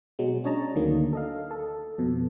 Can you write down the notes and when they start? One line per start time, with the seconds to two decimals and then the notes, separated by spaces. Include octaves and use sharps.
0.19 B2 F#3 G#3
0.44 C#4 D4 C#5 D#5 A5 A#5
0.75 D2 D3 D#3 F#3 A#3
1.13 A4 D#5 F5
1.51 A4
1.98 F2 B2